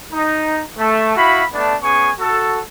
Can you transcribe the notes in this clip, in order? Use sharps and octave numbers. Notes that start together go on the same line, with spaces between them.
D#4
A3
E4 F#4 F5 B5
A3 B3 D4
B3 C#4 G#4 G#5 C#6
F#4 A4